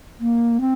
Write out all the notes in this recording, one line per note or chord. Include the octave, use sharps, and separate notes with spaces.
A#3
C4